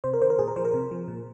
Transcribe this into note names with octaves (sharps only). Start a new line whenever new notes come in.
C3 C5
A#4
D#3 C5
A#4
A#2 G#4
A#4
F3 C5
A#4
C3
F3
A#2